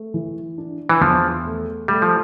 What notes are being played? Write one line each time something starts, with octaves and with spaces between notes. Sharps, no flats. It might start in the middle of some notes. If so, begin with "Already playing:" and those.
Already playing: A3
E3
D4
E3
E2 F3
A3
G3 A3
F3